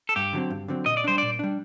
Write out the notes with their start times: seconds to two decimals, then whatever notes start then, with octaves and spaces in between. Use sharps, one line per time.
0.09 A4
0.16 G2 G4
0.33 D3 F#3 C4
0.50 G2
0.68 D3 F#3 C4
0.86 A#2 D#5
0.97 D5
1.04 G3 D4 C5
1.18 A#2 D5
1.39 G3 D4